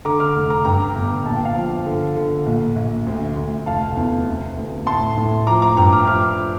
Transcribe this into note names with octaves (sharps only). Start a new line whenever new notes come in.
D3 A#5 D6
D6 F6
F1
A#5 D6
G2 G5 A#5
G1
A#1 A5
G5
F5 A5
F3
D3
D3
A#1
A#1
D2
D2
F1 F5 A5
E2
C3
D2
A2 A5 C6
A2
F3 A#5 D6
A#5 D6
G2 G5 A#5
D6 F6
F3 D6 F6